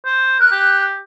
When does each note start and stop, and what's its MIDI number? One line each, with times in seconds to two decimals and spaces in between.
0.06 0.40 72
0.40 0.48 70
0.40 0.82 90
0.52 0.98 67